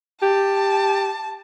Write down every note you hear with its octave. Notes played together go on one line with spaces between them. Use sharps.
G4 A5